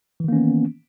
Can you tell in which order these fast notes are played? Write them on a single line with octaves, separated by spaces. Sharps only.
E3 D#3 A#3 C#4 B3